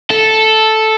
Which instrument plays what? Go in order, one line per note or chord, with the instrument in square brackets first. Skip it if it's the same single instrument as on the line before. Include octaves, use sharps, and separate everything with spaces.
[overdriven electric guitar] A4